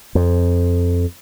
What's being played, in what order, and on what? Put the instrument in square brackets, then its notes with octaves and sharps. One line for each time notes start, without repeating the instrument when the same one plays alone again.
[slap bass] F2